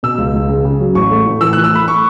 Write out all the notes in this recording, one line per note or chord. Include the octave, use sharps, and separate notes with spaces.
B2 E6
C#2
C#2
C#3
C#3
F#3
A1 C#6
A3
A2
E3 E6
E3 F#6
E6
A3 B5
C#6